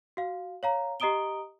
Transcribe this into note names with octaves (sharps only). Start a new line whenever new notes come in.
F#4 F5
C#5 F5 A#5
G4 D#5 A#5 D#6 D7 G7